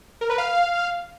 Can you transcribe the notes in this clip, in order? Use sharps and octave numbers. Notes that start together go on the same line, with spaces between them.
A#4
B4
F5